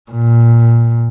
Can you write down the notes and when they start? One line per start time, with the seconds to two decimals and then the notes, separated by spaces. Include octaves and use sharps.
0.12 A#2